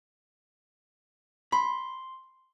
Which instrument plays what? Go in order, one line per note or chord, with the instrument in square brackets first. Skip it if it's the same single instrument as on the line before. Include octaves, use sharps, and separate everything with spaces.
[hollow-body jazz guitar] B5 [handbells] C6